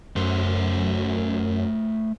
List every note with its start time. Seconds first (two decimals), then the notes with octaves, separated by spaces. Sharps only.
0.16 F#2 A3 C5